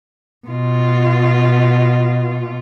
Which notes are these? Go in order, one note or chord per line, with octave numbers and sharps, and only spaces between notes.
B2 F4